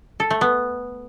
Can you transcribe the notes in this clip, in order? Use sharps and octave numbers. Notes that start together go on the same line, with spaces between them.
A4
A3
B3